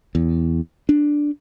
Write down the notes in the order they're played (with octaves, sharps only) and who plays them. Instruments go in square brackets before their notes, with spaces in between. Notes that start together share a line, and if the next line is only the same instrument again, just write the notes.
[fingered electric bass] E2
D4